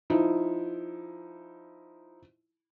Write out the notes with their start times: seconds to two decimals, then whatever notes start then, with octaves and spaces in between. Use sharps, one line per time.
0.10 F3 D#4 E4